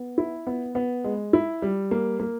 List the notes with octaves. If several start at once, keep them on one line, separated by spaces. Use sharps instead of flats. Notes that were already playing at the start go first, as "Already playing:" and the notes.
Already playing: B3
E4
B3
B3
G#3
E4
G3
A#3
A#3